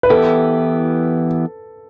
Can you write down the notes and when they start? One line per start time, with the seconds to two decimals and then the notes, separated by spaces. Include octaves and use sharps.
0.03 B4
0.10 E3 B3 E4 G4 A4